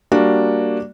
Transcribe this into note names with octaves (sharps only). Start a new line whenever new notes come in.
G3 A#3 D4 F#4